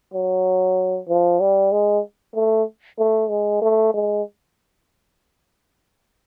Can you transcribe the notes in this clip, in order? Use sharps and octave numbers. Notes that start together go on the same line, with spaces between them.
F#3
F3
G3
G#3
A3
A3
G#3
A3
G#3